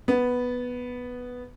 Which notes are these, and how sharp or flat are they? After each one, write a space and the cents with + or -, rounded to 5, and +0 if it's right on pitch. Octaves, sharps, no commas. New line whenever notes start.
B3 +0